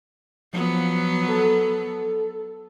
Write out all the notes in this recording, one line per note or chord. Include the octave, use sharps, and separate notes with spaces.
F3 F#3 B3
A4